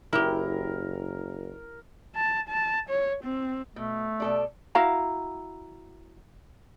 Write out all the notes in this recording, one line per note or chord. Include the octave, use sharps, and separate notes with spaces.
F#1 E4 G4 A#4
A5
A5
C#5
C4
B2 A3
B2 A4 D5
E4 F#4 F5 A#5